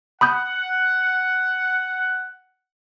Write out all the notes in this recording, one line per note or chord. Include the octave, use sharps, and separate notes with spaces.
F#5 B5 D#6 G6